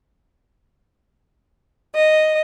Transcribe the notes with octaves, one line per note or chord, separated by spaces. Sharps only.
D#5